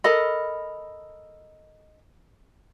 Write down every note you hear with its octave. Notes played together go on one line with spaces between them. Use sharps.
A4 A#4 D#5 B5